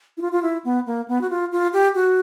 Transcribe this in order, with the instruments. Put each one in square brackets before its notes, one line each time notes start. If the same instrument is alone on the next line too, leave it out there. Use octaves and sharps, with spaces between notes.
[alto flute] E4
F4
F4
E4
B3
A#3
B3
F#4
F4
F4
G4
F#4